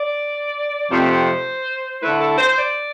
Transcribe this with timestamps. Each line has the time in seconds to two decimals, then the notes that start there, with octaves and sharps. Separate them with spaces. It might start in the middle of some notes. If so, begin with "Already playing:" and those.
Already playing: D5
0.90 F2 C3 F3 A3 C5
2.01 D3 A3 E4 B4
2.20 A4
2.38 C5
2.57 D5